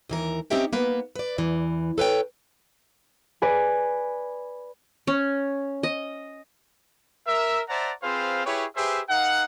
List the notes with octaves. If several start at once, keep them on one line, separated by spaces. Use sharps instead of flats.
D#2 E3 A#4
C4 C#4 D#4 G4 E5 G5
A#3 B3 B4
B4 D5
E2 E3
A4 B4 C#5 G5
B4 D5 G#5
C#4
D#5
A#4 E5
C5 D5 E5 F#5 A5 A#5
C4 F4 G#4 B4 C5 F5
E4 G4 G#4 B4 C#5
G4 G#4 B4 C5 E5
D#4 A#4 F5 F#5